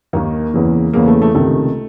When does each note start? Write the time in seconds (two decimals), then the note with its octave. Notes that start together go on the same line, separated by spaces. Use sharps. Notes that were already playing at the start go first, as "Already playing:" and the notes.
0.13 D#2 D#3 A#3
0.54 E2 C#3 E3
0.94 E2 C#3 E3 A#3
1.07 A3
1.22 A3
1.35 C#2 C3 D#3 A3